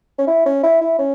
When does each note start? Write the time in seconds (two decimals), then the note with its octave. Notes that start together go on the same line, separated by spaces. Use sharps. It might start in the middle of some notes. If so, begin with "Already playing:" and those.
0.18 C#4
0.27 E4
0.46 C#4
0.63 E4
0.81 E4
0.98 C#4